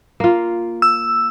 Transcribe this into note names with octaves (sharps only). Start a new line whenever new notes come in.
A#3 F4
E6